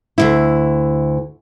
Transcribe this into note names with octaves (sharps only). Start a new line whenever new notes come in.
D2 G2 E4